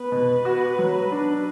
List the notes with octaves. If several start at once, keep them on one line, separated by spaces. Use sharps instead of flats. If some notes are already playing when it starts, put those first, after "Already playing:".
Already playing: B3 B4
B2
F#4
F#3
D4